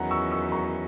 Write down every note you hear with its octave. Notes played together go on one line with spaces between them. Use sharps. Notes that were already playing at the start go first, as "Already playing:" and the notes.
Already playing: E2 D#3 F#3 C#4 F#5 A#5
C#6 E6
C#6 E6
A#5 C#6